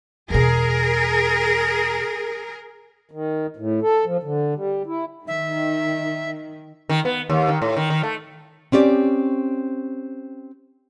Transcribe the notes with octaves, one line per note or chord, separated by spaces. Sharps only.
E2 B2 G#4 A#4
D#3
A2
A4
F3
D3
G3
E4
D#3 E5
D#3
B3
D#2
D#3
A2
D#3
D#3
A3
C4 C#4 G4 D5